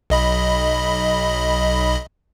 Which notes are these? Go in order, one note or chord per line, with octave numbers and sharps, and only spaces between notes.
B1 D#5 B5